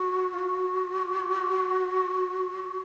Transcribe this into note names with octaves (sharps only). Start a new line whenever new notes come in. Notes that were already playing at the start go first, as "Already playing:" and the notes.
Already playing: F#4
F4
F#4